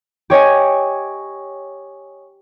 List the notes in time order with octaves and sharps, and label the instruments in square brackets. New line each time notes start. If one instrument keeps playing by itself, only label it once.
[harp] G4 C#5 D#5 G#5